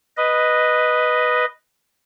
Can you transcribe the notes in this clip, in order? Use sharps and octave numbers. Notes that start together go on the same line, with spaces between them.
B4 D#5